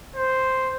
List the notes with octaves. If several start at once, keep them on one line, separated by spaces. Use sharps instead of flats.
C5